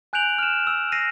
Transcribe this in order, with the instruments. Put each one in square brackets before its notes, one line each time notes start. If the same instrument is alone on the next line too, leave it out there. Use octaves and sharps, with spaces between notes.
[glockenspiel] G#5 F#6 G6 D7 F7 F#7
F6 E7
E6
A#6 C7 D#7